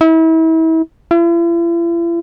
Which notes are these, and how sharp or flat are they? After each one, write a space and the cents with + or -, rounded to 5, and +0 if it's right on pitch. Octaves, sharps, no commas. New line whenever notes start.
E4 -35
E4 +45